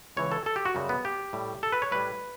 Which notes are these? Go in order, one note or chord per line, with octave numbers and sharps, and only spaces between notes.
C#2 C#3 E3 C#5
A4
A4
G4
F#4
F#2 C#3 G3
B3
G4
A2 G3
A4
B4
C#5
A2 G3 B4